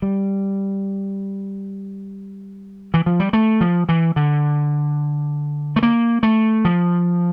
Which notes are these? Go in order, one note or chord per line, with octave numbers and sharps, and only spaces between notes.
G3
E3
F3
G3
A3
F3
E3
D3
A3
A#3
A3
F3